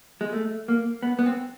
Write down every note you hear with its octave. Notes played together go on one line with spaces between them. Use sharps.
G#3
A3
A#3
B3
B3
C4